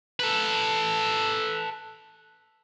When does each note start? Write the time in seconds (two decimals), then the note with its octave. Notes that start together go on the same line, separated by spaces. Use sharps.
0.20 A4 B4